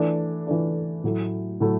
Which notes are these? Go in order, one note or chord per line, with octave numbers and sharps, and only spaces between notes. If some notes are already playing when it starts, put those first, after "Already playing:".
Already playing: E3 A3 D4
E3 A3 D4
A2 F#3 A3 E4
A2 F#3 A3 E4